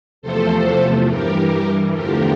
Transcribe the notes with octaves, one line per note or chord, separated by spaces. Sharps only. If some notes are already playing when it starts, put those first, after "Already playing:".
E2 C3 F3 A3 A4 C5
G2 E3 G3 G4 A#4
E2 D3 F3 A3 G4 A#4